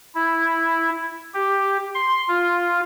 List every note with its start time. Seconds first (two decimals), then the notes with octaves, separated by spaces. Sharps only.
0.15 E4
1.34 G4
1.95 C6
2.28 F4